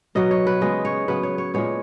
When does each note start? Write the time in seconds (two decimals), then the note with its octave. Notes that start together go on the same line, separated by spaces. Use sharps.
0.15 B2 F#3 B3 D#5
0.31 C#5
0.47 B4
0.61 C#3 G#3 B3 D#5
0.85 C#5
1.08 C#3 F#3 B3 B4
1.23 C#5
1.38 C#5
1.54 A#2 G#3 B3 C#5